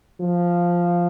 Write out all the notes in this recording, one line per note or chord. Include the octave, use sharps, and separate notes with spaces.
F3